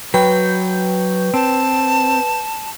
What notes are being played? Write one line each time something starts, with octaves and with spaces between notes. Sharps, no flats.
F#3 B4 G5 G6
C4 A5